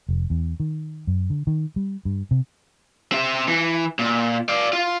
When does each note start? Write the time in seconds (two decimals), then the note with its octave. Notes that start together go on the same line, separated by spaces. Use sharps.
0.09 F1
0.30 E2
0.60 D#3
1.07 F#2
1.30 D3
1.47 D#3
1.76 G3
2.05 G2
2.31 C3
3.12 C4 E5
3.48 E3
3.99 A#2
4.49 D5 F5
4.73 F4